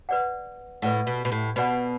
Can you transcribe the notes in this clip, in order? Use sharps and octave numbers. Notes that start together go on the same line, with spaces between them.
B4 D5 F#5
A2 B4 D5 F#5
B2
B2
A2
B2 B4 D5 F#5